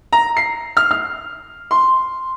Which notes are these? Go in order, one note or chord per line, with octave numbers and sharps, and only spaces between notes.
A#5
C7
F6
F6
C6